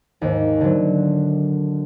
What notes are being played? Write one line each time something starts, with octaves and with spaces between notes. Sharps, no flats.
D#2 G#2
D3 F#3